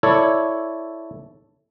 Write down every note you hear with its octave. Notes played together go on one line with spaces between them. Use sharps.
E4 A4 C#5 D5